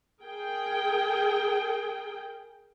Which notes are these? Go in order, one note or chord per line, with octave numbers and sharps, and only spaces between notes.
G#4 A#4 G5